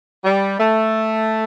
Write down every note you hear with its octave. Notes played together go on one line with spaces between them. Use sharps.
G3
A3